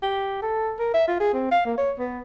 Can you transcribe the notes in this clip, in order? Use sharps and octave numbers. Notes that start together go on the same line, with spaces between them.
G4
A4
A#4
E5
F4
G#4
C4
F5
A#3
C#5
B3